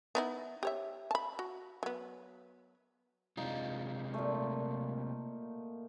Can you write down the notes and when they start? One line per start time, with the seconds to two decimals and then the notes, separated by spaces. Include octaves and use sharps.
0.15 B3 D#4 E4
0.63 G4 C#5 E5
1.11 A5 B5
1.39 F#4
1.83 F#3 B3
3.37 C3 G#3 D#4 F4
4.14 A#2 A3